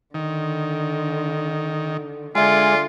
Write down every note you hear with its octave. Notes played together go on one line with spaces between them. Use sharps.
D3 D#3
D3 G#3 F4 D5 E5 G#5